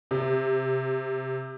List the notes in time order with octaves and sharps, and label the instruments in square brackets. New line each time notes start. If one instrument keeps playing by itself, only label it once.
[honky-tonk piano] C3